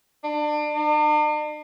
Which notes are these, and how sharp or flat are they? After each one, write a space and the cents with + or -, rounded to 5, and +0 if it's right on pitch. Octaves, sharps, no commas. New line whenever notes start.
D4 +30
D4 +45